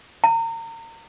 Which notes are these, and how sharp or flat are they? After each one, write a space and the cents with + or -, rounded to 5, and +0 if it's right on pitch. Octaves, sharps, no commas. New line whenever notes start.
A#5 -30